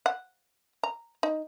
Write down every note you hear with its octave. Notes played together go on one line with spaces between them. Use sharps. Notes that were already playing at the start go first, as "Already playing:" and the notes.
F#5
A#5
D#4